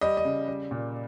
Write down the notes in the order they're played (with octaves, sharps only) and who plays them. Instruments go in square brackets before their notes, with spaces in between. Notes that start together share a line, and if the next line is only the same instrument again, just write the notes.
[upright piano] G3 D#5
D#5
C#3
G3
A#2